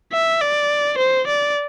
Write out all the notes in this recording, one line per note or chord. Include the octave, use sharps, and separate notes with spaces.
E5
D5
C5
D5